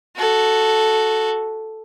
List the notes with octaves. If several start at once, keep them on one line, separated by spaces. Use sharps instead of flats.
F#4 A4